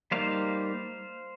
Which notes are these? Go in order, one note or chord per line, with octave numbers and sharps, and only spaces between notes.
G3 A#3 D#4 C5 F5